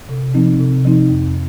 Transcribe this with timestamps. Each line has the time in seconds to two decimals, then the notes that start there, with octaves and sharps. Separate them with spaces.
0.09 C3
0.34 F3 C4 D#4
0.59 C3
0.85 F3 C4 D#4
1.10 F2